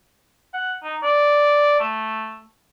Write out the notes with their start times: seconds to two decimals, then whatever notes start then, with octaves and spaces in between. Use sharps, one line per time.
0.54 F#5
0.83 D#4
1.03 D5
1.80 A3